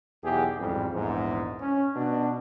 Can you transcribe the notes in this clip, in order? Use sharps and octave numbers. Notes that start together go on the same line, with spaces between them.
B1 E2 G4 G#4
A1 F2 G#2 G3
A#1 E2 G#2
C#4
B2 D4